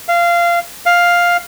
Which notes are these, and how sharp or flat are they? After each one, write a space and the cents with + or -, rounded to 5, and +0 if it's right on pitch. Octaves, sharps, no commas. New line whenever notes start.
F5 -20
F5 +5